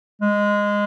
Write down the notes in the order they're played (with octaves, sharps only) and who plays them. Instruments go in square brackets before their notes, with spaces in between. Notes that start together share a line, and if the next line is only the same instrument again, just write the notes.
[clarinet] G#3